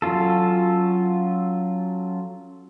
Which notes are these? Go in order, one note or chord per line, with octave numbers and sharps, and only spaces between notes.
F#3 C#4 F4 A4